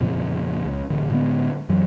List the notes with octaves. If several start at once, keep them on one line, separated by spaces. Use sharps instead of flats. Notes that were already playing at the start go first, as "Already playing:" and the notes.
F2 A#2 C#3 F3
C#2
D#1 A1 D3
A2 D3 G#3 B3
F#2 E3 F#3